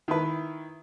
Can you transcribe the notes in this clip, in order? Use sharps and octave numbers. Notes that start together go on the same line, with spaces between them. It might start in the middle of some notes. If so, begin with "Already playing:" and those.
D#3 E4 B4